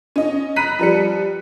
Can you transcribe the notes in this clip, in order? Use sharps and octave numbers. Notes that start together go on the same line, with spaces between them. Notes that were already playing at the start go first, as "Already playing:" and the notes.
C#4 D#5
A#5 B5 F#6 B6 D#7
F3 G3 C#7